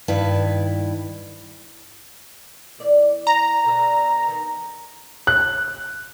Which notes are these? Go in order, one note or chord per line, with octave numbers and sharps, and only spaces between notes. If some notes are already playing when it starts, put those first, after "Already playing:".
G2 D#3 E4 B4
E2 D5
A#5
B2 D3 E5
D#3
F#6